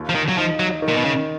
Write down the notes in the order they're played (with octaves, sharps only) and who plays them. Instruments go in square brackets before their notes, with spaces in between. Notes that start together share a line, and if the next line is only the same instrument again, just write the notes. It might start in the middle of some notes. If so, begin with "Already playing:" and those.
Already playing: [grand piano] D#2 F4
[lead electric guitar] F3
D#3
F#3
[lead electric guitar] F3 [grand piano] D#4
[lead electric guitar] F#3
[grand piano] D#3
[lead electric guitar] A#2
B2
C#3